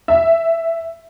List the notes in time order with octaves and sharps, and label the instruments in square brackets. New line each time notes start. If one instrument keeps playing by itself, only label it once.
[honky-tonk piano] E5